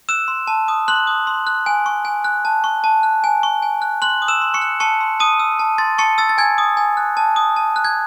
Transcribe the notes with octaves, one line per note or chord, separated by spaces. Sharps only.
E6 F#6 E7
C6
A5
D#6
C6 F#6 F#7
D#6
C6
F#6
G#5
C#6
G#5
F#6
A5
C#6
A5
F#6
G#5
C#6
G#5
F#6
C6 F#6 F#7
D#6
E6 E7
C6
C#6 C#7
F#6
A5 C#6 C#7
C6
A5 D#6 D#7
E6
A5
C6 A6
A5 C#6 C#7
E6 A6
A6
G#5 G#6
D#6
G#5
F#6
A5
D#6
A5
F#6
G#6